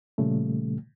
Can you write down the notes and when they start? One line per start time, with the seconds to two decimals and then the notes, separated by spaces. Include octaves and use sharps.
0.18 A#2 C#3 F3 G3 A3